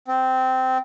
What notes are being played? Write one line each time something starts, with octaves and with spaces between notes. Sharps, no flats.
C4